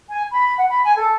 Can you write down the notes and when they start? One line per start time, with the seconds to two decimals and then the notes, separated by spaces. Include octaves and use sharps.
0.10 G#5
0.30 B5
0.57 F#5
0.69 B5
0.84 G#5
0.96 A4